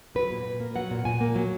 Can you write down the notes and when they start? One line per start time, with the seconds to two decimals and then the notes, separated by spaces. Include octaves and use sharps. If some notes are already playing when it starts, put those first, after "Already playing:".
0.15 F#3 B4
0.31 A#2
0.45 A#2
0.60 A#3
0.75 F#3 F#5
0.91 A#2
1.05 A#2 G#5
1.21 A#3
1.35 F#3